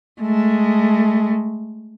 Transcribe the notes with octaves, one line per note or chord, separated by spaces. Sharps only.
G#3 A3